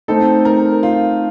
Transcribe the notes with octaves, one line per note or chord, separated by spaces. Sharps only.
A3 C4 D#4 A4
A#4
F4